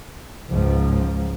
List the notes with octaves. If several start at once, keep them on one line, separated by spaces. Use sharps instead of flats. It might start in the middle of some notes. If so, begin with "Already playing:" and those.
C#2 G#2 F3